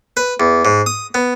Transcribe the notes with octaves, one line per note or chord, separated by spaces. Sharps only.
B4
E2
G#2
D#6
B3